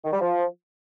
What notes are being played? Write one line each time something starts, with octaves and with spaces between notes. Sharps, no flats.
D#3
G3
F3